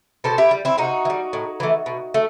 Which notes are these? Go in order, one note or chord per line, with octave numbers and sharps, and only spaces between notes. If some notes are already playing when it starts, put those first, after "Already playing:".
B2 A4 C5
E4 G4
G3
C4 E4
C3 D#4 F#4
E3
G3
A2
E3 A3
B2
A3